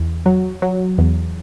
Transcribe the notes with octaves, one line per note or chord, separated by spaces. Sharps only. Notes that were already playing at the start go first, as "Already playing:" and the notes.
Already playing: E2
F#3
F#3
E2